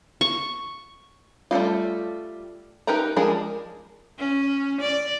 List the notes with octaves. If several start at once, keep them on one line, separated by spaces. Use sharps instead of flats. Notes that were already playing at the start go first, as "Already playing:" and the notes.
C#6
G3 A3 A#3 F4
D#4 G4 A#4 B4 A#5
F3 G#3 D4 G#4 A#4
C#4
D5